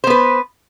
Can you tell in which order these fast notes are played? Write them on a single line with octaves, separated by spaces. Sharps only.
C5 B3 B4